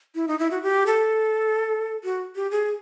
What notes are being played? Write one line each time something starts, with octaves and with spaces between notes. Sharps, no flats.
E4
D#4
E4
F#4
G4
A4
F#4
G4
G#4